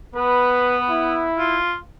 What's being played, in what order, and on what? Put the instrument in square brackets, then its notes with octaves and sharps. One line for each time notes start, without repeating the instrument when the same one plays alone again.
[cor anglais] B3 [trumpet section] B4
[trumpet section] E4
[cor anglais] F4